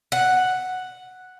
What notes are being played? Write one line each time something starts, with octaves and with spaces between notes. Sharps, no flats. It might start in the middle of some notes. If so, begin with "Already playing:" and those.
F#5